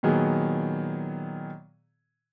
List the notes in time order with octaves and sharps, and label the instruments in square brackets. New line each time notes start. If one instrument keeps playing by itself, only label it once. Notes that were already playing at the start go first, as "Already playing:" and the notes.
[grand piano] A#2 D#3 F#3 B3 G#4